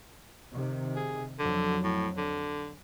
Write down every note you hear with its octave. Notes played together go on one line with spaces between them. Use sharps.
C3 D#3
G#4
F2 D3 F#3
A2
D3